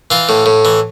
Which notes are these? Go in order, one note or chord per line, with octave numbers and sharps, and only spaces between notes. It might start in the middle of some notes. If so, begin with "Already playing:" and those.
E3 F4
A2
A2
E3